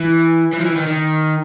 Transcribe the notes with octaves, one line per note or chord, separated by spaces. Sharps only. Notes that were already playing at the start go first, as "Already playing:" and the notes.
Already playing: E3
E3
F3
E3
D#3
D#3